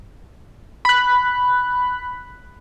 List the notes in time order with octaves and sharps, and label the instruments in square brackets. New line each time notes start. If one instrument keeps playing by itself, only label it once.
[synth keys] B5 F#6